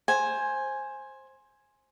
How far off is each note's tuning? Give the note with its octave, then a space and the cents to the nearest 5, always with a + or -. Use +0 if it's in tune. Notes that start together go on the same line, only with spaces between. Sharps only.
C5 +15 G#5 +0